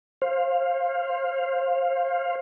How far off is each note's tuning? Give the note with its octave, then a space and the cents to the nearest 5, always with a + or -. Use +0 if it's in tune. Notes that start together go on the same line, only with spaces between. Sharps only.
C5 +25 F5 +0